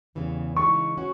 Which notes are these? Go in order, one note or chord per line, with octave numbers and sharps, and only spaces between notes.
E2 C#3 E3 G3
C#3 E3 G#3 B3 D#4 C#6
C#4 F#4